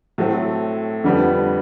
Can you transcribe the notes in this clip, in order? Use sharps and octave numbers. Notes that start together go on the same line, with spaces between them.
A2 F#3 A3 C4
F2 D3 G3 B3